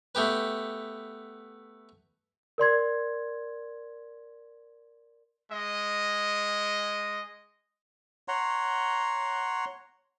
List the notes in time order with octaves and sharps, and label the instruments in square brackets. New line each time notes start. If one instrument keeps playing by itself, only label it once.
[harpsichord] A3 B3 G4 B4
[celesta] A#4 D5 C6 G#6
[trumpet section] G#3 D#5
[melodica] C#5 F#5 A#5 C6